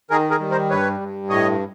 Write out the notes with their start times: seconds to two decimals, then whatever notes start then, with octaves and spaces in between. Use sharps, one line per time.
0.10 D#3 G#4 A#4
0.30 G#4 A#4
0.40 G3
0.51 A#4 C5
0.70 G2 B4 C#5
1.00 G2
1.29 A2 C#5 D#5